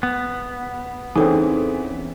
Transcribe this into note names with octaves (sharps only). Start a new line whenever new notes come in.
B3
E2 E3 C4 C#4 D#4 G#4 A4